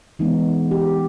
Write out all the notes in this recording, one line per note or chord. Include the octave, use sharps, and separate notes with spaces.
E3 G#3 B3 D#4
G4